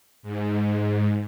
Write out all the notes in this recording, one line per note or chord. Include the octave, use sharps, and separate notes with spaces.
G#2